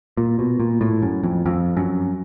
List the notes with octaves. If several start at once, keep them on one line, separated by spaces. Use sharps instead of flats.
A#2
B2
A#2
A2
F#2
F2
F2
F#2